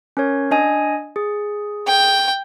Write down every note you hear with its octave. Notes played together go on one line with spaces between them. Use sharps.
C#4 A#4 C#5
D4 D#5 G#5
G#4
G5